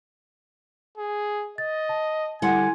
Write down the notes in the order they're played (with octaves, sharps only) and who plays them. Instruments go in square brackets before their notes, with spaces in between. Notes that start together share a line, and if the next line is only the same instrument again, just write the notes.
[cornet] G#4
[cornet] D#5 [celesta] A6
[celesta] A5
[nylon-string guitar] D3 G3 F#5 [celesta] E4 C6 [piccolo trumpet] G#5